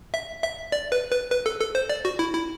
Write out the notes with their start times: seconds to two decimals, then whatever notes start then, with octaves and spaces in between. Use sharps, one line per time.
0.14 E5
0.43 E5
0.72 D5
0.92 B4
1.12 B4
1.31 B4
1.46 A4
1.60 A4
1.75 C5
1.90 D5
2.05 F#4
2.19 E4
2.34 E4